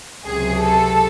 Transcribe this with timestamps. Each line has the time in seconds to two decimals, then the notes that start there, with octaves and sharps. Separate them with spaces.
0.25 C#2 C3 F#3 G#4
0.63 A4